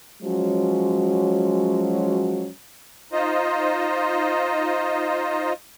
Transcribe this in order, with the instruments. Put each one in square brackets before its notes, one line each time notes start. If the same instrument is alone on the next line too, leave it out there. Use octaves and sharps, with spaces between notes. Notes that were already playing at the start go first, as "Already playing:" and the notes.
[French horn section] F3 F#3 G#3 C#4 F#4
[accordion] D#4 F4 C5 D#5